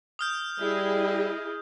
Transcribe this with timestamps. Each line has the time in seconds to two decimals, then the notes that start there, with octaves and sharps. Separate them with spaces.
0.19 D#6 F6 G6
0.60 G3 E4 G#4 D#5